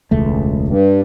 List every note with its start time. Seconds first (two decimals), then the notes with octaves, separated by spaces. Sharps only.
0.11 E1 C#2 A3
0.68 G2